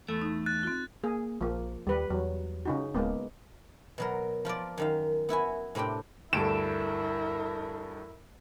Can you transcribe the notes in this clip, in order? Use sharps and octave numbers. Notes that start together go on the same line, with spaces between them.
E2 A3 A4
D#4
F#6 A6
C4 F4
A#3 G#4
A#1 F3 A#3
D#2 G3 B4
E2 F#3
C#3 D#4 F#4
D1 G#3 A#3 B3
B2 F#3 A#4
F3 F4 A#4 D5
F#2 D#3 F5
B3 E4 F#4 G#5
A2 C3 C4 D4 G5
D2 G2 E4 A4 A#4 D7 E7